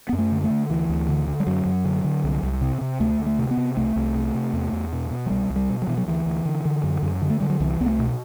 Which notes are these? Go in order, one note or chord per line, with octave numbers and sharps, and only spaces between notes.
F#2 B3
A3
D3
A3
D3
D2 E3
D2
D3
D3
G3
F#2 F#3
F#2
D3
D3
C2
C2
C3
C3
D2 A3
D2
A3
C3
B3
C3
C2 A3
C2
C3
C3
E2
E2
B2
B2
F#3
C2 G3
C2
G3
B2
F#3
B2 E3
F#3
D2 E3
D2
D3
D3
F#2
F#2
D3
A3
D3 G3
F#3
C2 E3
C2 B3
A3
B2